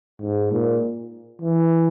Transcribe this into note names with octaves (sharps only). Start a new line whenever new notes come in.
G#2
A#2
E3